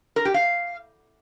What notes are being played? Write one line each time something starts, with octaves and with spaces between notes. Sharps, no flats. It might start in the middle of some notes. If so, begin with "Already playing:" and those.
A#4
G4
F5